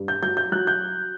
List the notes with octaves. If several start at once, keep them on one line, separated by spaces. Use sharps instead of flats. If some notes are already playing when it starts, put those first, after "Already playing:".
Already playing: G2
G6
F#3 G6
G6
F#3 F#6
G6